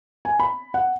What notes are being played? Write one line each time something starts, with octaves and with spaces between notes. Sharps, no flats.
G#5
B5
F#5